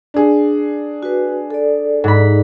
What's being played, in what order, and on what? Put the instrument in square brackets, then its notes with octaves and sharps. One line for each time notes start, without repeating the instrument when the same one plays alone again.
[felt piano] D4 G#4
[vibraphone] F#4 B4
A4 D5
[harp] G#2 B5